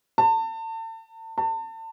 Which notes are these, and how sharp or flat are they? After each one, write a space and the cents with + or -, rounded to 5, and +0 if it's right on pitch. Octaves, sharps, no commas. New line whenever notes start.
A5 +35
A5 +35